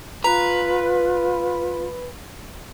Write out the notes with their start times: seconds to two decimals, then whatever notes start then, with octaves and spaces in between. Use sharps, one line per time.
0.24 F4 B4 A#5